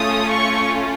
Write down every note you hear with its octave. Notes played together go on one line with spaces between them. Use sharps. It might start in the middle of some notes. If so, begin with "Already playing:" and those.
Already playing: A3 C#4 F4 D#6
C#6